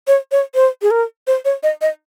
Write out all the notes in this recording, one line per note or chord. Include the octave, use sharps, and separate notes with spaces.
C#5
C#5
C5
G#4
A#4
C5
C#5
D#5
D#5